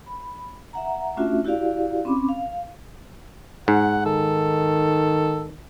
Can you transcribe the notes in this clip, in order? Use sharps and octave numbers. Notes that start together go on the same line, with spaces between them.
B5
E5 F#5 A#5
A3 C#4 D4 F4 F#4 E5
E4 F#4 G4 D5 F5
C4 C#4 B5 D6
F5
G#2 F#5
D#3 A4